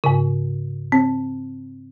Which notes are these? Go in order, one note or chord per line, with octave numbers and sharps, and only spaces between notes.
G#2 C#3
C4